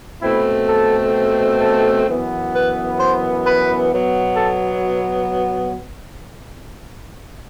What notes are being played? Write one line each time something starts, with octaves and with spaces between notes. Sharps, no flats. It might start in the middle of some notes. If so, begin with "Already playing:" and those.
B2 A3 C4 E4
A4
A4
F#2 E3 B3
B4
C5
B4
B2 F#3 B3
A4